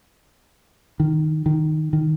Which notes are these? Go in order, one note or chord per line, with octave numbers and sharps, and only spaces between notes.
D#3
D#3
D#3